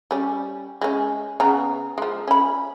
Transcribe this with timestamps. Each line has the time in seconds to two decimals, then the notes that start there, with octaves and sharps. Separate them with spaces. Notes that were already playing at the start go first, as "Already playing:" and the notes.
0.11 G3 C#4
0.81 G#3 C#4
1.40 C#3 B3 A#5
1.98 F3 G#3
2.28 C#4 B5